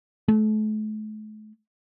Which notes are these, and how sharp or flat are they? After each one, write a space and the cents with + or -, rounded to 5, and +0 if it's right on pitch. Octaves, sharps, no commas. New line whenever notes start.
A3 -40